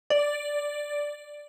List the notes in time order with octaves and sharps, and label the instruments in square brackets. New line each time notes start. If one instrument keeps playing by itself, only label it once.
[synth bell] D5